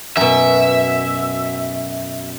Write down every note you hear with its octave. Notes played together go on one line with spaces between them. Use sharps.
F#2 B2 E5